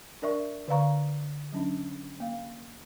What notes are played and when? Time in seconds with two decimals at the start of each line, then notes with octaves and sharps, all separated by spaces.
0.22 D4 A#4 D5 E5 C#6
0.68 D3 B4 D5 F5 A#5 C#6
1.52 F#3 C#4 D4
2.20 A#3 F5